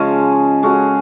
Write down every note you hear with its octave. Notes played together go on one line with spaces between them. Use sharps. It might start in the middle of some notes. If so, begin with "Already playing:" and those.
Already playing: C#3 F3 G#3 C#4
G#3 C#4 F#4 A4